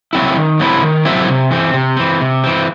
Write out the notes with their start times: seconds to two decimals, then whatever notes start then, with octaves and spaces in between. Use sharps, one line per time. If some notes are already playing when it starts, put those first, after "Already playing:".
0.13 F#3 A3 C4 E4
0.37 D#3
0.59 F#3 A3 C4 E4
0.82 D#3
1.05 F#3 A3 C4 E4
1.29 C3
1.51 E3 C4
1.74 C3
1.97 E3 C4
2.21 C3
2.44 E3 C4